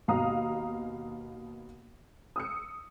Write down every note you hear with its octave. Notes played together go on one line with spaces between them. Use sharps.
D#2 B2 F5 A#5 D#6
D#6 E6 C#7